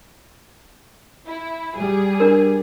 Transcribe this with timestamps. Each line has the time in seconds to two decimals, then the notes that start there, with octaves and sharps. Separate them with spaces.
1.28 E4
1.77 G3 G#4
2.20 D4 A#4